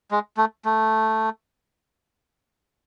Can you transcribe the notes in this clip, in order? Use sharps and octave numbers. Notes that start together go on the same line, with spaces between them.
G#3
A3
A3